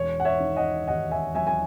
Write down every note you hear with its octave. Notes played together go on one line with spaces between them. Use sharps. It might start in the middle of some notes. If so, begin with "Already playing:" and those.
Already playing: E1 C#5
F#5
C#5 E5
D#3
D#5 F#5
D#2 D#5 F#5
E5 G#5
F#3 E5 G#5
G#5